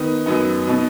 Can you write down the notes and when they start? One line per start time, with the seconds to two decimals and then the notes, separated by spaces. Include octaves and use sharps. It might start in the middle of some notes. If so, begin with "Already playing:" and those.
Already playing: D#3 B3 D#4
0.26 F#2 F#3 B3 D#4
0.67 B2 B3 D#4